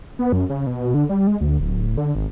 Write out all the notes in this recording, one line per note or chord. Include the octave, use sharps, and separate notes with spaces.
B3
F#2
C#3
B2
D3
G3
G#3
D2
D1
D3
G#1